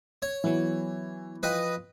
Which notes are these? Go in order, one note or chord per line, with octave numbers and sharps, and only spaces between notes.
C#5
E3 F#3 B3 E4
F3 F4 B4 D#5 G5